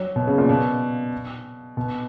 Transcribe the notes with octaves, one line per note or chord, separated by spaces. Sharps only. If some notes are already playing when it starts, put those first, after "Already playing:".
Already playing: F#3
B2
C#3
A#2
B2
B2